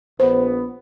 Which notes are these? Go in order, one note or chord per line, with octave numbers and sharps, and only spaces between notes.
A#1 B3 C5